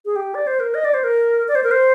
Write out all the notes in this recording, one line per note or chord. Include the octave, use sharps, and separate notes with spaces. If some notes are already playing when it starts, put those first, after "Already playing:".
G#4
G4
D5
C5
A#4
D#5
D5
C5
A#4
D5
C5
A#4
C5